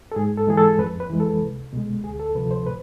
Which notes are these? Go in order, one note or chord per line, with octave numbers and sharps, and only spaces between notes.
A4
G#2 G#4
A4
E3 G#3 G#4
A4
F2 B4
B4
E3 G#3
A4
C2
B2 G#3
D2 G#4
A4
C3 F3 B4
C5
A2 B4